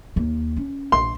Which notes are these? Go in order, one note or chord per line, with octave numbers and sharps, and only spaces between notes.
D#2 A#3
C#4
A#1 C6